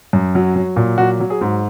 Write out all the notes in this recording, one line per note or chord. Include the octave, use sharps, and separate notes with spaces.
F#2
F#3
F#3
A#2
F#3 F#4
F#3
G#4
G#2